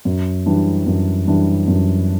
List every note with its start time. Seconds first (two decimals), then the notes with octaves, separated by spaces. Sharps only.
0.05 F#2
0.46 E3 G3 D4
0.87 F#2
1.27 E3 G3 D4
1.68 F#2